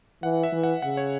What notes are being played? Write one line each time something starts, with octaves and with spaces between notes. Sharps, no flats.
E3 F#5
E5
E3
F#5
C#3 F#5
C#5